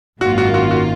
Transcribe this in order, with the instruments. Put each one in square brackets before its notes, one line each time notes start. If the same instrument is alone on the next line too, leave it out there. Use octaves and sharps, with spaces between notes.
[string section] G#1 F#2 D#3 A#3 F4 [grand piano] F#4
[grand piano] F#4
F#4
F#4